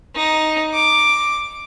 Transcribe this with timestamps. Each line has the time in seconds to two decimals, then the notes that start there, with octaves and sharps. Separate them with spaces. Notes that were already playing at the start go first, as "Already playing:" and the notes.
0.15 D#4
0.74 D6